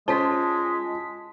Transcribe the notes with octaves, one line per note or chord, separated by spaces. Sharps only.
G#3 C#4 F4 C5 A5 B6